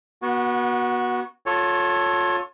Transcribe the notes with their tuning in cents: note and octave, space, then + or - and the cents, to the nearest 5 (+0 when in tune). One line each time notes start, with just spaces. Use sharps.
B3 -35 F#4 -5
F4 +30 A4 +0 C#5 +0